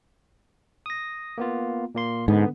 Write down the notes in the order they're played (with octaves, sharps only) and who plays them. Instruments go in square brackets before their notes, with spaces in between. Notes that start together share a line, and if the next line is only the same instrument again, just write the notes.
[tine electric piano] D#6 A#6
A#3 B3 F4
A#2 A#3 C6
[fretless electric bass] G#2 [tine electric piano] D3 B3